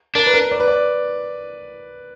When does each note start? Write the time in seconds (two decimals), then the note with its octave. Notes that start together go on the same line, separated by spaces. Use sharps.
0.15 D4 A#4
0.26 B4
0.34 A#4
0.51 D5
0.60 B4
0.68 D5